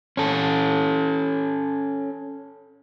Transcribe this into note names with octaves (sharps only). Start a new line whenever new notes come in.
C#4 A4